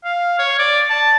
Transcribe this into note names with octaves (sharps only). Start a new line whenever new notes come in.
F5
C#5
D5
A5